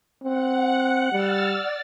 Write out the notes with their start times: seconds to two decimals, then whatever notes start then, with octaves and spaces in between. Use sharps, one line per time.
0.23 C4 F#5
1.12 G3 E6 F6 A6
1.49 D5